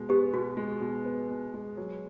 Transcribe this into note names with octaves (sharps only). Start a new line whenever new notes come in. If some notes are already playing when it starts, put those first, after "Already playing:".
Already playing: B2 G#3
B3 G4
B2 F#4
G#3
B2
B3
B2
G#3
F#3